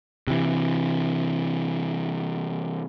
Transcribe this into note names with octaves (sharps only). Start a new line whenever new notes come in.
C3 E3